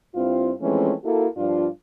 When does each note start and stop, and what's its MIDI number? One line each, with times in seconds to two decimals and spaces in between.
0.15 0.51 43
0.15 0.51 60
0.15 0.51 64
0.15 0.51 65
0.61 0.92 52
0.61 0.92 53
0.61 0.92 56
0.61 0.92 57
0.61 0.92 60
0.61 0.92 61
1.04 1.26 58
1.04 1.26 64
1.04 1.26 66
1.04 1.26 69
1.36 1.67 43
1.36 1.67 53
1.36 1.67 62
1.36 1.67 65